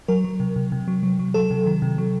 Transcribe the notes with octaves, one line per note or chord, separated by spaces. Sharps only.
F#3 A#4
F#3
C3
C3
C3
F#3
F#3
F#3
F#3 A4
C3
D#3
C3
F#3